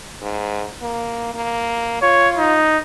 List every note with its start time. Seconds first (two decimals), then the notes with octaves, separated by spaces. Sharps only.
0.22 G#2
0.82 A#3
1.34 A#3
2.02 F4 C#5
2.38 D#4